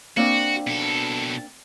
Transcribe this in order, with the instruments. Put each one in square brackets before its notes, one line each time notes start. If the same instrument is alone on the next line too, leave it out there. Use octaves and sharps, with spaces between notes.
[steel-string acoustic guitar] A#3 C4 D4 [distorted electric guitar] F#4
[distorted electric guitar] B2 A4